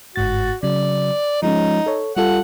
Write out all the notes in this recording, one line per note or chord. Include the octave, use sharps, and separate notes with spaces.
G1 G#2 F#4 A6
C#3 F#3 D5
F3 G#3 C#4 D#4
A4 C#5
G3 F4 A4 F#5